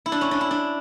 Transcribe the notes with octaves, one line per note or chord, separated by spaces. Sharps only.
E4
D4
C#4
D4
E4
D4